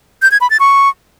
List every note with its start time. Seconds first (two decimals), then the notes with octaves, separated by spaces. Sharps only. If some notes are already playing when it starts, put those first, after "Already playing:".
0.22 G6
0.32 G#6
0.41 B5
0.50 A6
0.60 C#6